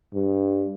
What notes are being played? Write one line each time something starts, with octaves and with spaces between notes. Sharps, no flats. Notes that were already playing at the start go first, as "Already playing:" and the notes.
G2